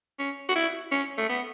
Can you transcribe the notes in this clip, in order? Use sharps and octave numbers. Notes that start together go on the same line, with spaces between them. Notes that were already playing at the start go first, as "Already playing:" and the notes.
C#4
F#4
E4
C#4
A3
B3